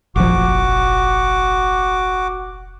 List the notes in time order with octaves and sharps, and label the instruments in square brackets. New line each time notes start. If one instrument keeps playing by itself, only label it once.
[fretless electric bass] F1 A#1 F3 [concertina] F#4 D6